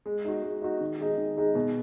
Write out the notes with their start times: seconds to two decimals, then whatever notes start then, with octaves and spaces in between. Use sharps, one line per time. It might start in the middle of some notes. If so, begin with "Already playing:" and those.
0.06 G#3
0.25 D#4 F#4
0.43 G#3
0.62 D#4 F#4
0.80 D#3
0.99 G#3 D#4 G#4
1.17 D#3
1.37 G#3 D#4 G#4
1.55 B2